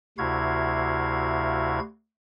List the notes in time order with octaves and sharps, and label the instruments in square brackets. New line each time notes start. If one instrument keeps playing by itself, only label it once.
[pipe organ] D2 C3 E4 F#4 F5 G#6